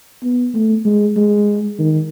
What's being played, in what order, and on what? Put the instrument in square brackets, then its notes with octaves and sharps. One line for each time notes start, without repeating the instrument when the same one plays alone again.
[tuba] B3
A3
G#3
G#3
D#3